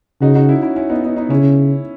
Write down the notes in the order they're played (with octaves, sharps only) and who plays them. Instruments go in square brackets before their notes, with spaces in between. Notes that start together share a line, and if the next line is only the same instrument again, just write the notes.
[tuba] C#3 [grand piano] D#4 F#4
[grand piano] D#4 F#4
C#4 E4
C#4 E4
C#4 E4
B3 D#4
B3 D#4
B3 D#4
[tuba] C#3 [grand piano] C#4 E4